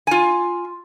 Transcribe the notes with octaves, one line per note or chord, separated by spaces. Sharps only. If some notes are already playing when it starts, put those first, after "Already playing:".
F4 G#5